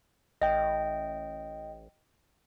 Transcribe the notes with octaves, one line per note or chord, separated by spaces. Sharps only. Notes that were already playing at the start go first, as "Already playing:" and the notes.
A1 D#5 G5